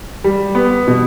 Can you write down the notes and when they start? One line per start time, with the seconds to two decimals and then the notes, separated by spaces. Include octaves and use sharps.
0.24 G3
0.55 B3
0.88 B2